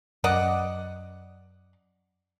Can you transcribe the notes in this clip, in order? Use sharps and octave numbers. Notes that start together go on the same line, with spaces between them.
F#2 D5 D#5 F#5